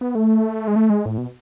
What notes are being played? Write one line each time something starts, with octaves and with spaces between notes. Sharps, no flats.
B3
A3
G#3
A3
G#3
A2
B2